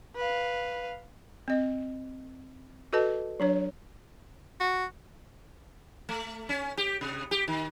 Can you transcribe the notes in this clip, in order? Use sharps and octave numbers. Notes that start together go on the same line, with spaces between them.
B4 F5
C4 D#5
F#4 A4 B4 D#5 A5
F#3 D4 C#5
F#4
A3
C#4
G4
C3
G4
D#3